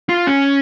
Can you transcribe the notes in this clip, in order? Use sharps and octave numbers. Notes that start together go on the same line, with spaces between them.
F4
C#4